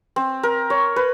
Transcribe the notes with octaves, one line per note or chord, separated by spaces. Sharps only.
C4
A#4
C#5
B4